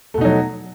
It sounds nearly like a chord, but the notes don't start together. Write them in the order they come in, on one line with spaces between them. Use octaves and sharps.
A3 B2 D#4 F#3